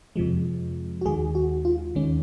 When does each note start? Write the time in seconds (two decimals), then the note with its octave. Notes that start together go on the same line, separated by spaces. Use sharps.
0.16 F2 C3 F3 G#3
1.01 F#4
1.05 D#2 D#3 G#3 G#4
1.35 F#4
1.65 F4
1.95 D#2 D#3 G#3 C#4